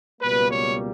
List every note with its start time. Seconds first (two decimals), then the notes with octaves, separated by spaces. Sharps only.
0.21 C#2 B2 G3 A#3 B4
0.50 C#5